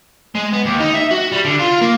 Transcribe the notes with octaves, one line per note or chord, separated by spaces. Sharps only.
G#3
B3
D#2
D#4
E5
F#4
G3
D3
F4
A#3